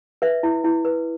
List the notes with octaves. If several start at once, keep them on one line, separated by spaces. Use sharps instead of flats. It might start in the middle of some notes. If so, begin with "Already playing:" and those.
B4 E5
E4
E4
B4